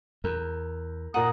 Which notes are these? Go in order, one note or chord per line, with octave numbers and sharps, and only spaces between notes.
E2 A#4
A#2 F#5 A#5 D#6 D#7